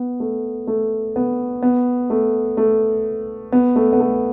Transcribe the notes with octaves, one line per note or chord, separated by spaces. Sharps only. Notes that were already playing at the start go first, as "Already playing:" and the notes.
Already playing: B3
A3
A3
B3
B3
A3
A3
B3
A3
B3
A3